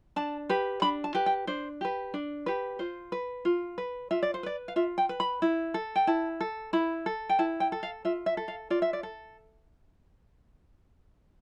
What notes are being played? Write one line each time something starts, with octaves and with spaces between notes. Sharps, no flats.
D4 A5
G4 B4
D4 B5
A5
G4 B4
G5
D4 C5
G4 B4
D4
G4 B4
F4 C5
B4
F4
B4
F4 E5
D5
C5
B4 D5
F5
F4 E5
G5
B4
B5
E4
A4
G5
E4 A5
A4
E4 B5
A4
G5
E4 A5
G5
A4
F5
F4 E5
E5
A4
F5
F4 D5
E5
D5
A4